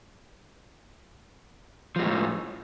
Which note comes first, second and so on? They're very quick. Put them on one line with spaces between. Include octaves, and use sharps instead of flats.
F3 G#3 A2